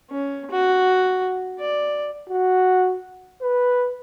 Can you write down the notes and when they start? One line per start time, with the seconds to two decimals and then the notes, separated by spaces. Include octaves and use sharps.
0.10 C#4
0.51 F#4
1.60 D5
2.29 F#4
3.42 B4